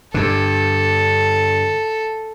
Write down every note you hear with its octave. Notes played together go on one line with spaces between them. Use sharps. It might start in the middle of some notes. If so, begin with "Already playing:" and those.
G2 D3 A4